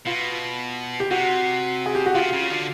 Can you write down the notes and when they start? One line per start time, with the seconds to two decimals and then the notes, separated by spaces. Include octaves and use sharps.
0.06 B2 F4
1.00 G4
1.11 C3 F#4
1.86 G#4
1.95 G4
2.06 F#4
2.15 C#3 F4
2.33 C#3
2.50 D3